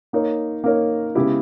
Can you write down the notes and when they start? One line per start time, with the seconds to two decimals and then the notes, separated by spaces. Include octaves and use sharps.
0.13 A#3 D#4 A#4 C#5
0.64 A#3 D#4 A#4 C#5
1.15 C#3 G#3 B3 E4 G4